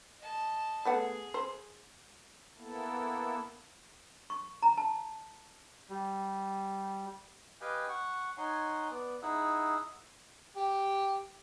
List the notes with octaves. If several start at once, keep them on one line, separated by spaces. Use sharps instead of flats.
D#5 A5
A3 B3 G#4 F#5
C5
A#3 B3 E4 A4
C#6
A#5
A5
G3
G4 B4 D#5 F5 G5 G#5
F#5 C#6
D#4 C#5 F#5 G#5 C6
B3 D5
D#4 E4 G#4 F#5 E6
G4